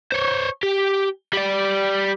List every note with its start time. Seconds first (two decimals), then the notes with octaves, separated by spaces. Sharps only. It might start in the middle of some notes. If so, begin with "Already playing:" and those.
0.12 C5 C#5
0.63 G4
1.33 G3 D5